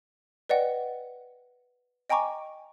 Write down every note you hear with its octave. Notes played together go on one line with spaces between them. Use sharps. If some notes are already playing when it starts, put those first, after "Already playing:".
B4 D5 D#5 F#5 G5
D#5 G5 G#5 A#5 C#6 D6